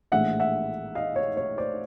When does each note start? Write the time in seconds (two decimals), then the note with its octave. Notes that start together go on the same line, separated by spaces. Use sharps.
0.12 A#1 A2 E3 G#3 E5 F#5
0.40 E5 F#5
0.95 D#5 F5
1.16 C#5
1.37 C#5
1.58 C5 D5